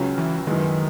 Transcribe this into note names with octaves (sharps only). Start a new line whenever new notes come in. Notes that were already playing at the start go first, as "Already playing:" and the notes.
Already playing: C#2 C#3 F#3 C#4
E3
F#2 D#3 E3 G#3